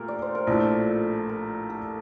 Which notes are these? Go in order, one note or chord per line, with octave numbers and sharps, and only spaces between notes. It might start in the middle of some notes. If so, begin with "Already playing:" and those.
Already playing: A#2 F3 A3 A#4
D5
C5
A#4
A#1 A2 F3 A3 D4 A4
A#4
A4